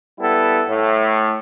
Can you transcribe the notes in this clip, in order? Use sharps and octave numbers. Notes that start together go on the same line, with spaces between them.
G3 B3 E4 A4
A2